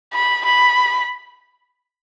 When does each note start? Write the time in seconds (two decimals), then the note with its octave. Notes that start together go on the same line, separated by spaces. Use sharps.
0.13 B5
0.45 B5